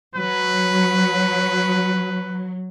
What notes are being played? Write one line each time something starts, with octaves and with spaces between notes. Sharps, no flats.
F#3 B4